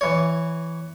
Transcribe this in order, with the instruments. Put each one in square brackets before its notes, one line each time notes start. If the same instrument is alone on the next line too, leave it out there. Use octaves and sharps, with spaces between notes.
[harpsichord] E3 C#5